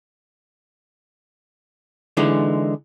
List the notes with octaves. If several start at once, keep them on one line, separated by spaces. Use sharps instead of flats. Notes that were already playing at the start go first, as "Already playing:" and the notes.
D3 E3 G#3 D#4